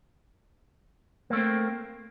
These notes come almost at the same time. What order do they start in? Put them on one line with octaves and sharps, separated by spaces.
A#3 A3 C4